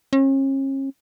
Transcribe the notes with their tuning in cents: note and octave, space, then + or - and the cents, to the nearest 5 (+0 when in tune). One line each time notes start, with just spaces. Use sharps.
C#4 -40